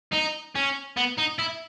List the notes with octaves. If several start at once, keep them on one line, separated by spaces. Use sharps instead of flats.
D#4
C#4
B3
D#4
E4